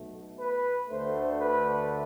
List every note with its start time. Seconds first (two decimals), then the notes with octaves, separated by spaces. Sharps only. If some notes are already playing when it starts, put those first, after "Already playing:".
Already playing: B1 B2 A3
0.39 B4
0.89 D2 D3 A3 C5
1.40 B4